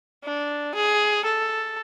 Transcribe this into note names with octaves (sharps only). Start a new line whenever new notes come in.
D4
G#4
A4